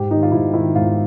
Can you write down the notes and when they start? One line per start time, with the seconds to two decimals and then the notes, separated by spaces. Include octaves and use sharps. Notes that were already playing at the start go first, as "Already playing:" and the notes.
Already playing: G#2 G4
0.11 D#3 D#4
0.22 F4
0.32 G#2 E4
0.53 D#3 E4
0.75 G#2 F4